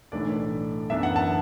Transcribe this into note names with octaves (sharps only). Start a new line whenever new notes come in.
B1 A2 E3 A3 D4 D5
F#2 E3 B3 D4 E5
F#5
A5